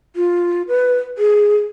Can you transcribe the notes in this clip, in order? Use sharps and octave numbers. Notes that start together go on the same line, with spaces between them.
F4
B4
G#4